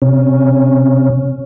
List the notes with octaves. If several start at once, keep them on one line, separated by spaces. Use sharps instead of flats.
C3 C#4